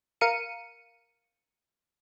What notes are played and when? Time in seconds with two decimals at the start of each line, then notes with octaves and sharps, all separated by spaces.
0.21 A#4 F5 C#7 D#7